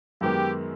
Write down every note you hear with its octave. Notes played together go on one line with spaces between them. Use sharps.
F#2 D#3 G#3 B3 G4